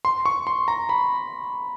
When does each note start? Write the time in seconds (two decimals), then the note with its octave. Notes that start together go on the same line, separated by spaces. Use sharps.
0.05 C6
0.26 C#6
0.47 C6
0.68 A#5
0.89 B5